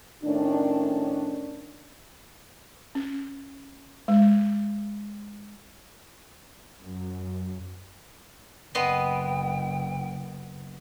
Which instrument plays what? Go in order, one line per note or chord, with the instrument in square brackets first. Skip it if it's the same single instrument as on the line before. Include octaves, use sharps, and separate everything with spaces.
[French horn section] A2 D#3 C#4 D4
[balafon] C#4
G#3
[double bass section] F#2
[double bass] F#1 [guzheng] B3 D#5 C6 [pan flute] G5